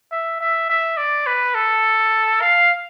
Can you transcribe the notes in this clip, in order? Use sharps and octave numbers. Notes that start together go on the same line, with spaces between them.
E5
E5
E5
D5
B4
A4
F5